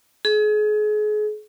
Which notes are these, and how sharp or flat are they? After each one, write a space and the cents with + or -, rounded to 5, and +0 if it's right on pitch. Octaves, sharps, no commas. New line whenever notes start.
G#4 +35